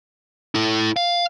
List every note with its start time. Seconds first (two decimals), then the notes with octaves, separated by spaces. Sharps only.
0.55 E4 A4
0.96 F5